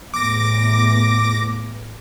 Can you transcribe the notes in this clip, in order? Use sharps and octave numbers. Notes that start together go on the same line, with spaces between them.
E2 A2 D6 A#6